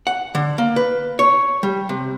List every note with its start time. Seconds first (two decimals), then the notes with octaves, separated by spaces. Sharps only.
0.07 F#5
0.35 D3
0.58 A#3
0.76 B4
1.19 C#5
1.63 G3
1.89 C3